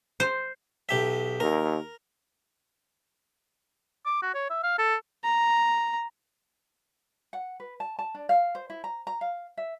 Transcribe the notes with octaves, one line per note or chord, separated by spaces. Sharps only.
C5
B1 G4 E5
D#2 A#4
D6
F#4
C#5
E5
F5
A4
A#5
F#5
B4
A5
A5
D4
F5
C5
E4
A#5
A#5
F5
E5